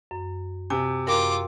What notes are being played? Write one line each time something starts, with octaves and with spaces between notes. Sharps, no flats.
F#2
C3 G#5
F#2 F4 A#4 G5 D6